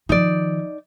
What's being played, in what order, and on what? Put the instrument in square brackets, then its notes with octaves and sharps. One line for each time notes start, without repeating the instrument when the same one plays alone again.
[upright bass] D#3 F3 [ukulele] D#4 D5